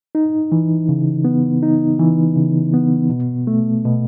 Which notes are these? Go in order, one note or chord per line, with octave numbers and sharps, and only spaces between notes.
D#4
E3
C#3
B3
D#4
E3
C#3
B3
B2
A3
B2